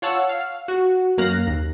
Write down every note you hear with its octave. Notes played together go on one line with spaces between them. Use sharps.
F4 C#5 F#5 A5 E6
F5
F#4
F#2 A#3 F5 F#6 A#6
D#2